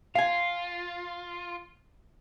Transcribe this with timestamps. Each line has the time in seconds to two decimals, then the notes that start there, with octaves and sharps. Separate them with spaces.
0.15 F4 F5 G#5